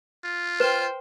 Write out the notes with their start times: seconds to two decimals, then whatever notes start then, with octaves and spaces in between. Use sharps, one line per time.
0.24 F4
0.60 B4 C5 G5